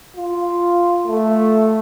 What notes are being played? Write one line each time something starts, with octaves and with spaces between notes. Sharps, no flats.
F4
A3